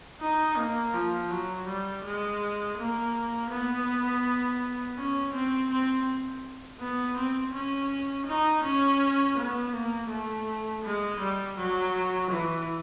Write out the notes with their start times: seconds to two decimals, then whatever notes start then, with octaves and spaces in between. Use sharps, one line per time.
0.21 D#4
0.57 A#3
0.94 F3
1.30 F#3
1.67 G3
2.04 G#3
2.77 A#3
3.51 B3
4.97 C#4
5.33 C4
5.70 C4
6.80 B3
7.16 C4
7.54 C#4
8.26 D#4
8.63 C#4
9.37 B3
9.73 A#3
10.10 A3
10.84 G#3
11.19 G3
11.57 F#3
12.30 E3